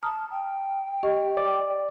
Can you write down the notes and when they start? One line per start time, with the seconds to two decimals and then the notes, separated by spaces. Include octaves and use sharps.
0.03 A5 A#5 D#6 F6
0.30 G5
1.03 G4 D#5 C#6
1.37 D5 D6